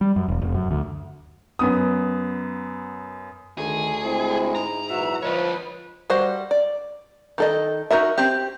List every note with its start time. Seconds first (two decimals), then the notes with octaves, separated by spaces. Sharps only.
0.01 G3
0.16 F#2
0.28 E1
0.42 F1
0.54 F#2
0.71 D2
1.59 F#2 B3 D#6
3.58 D2 D#3 G#4
4.04 G#3 C4 E4
4.55 G#2 A#5
4.90 F#2 A#2 E3 F#4 E5
5.22 F3 F4 B4 C#5 D#5
6.10 G3 F#4 C5 F#5
6.51 D5
7.38 D#3 A4 D#5
7.91 D#4 F#4 A#4 E5
8.18 C4 G4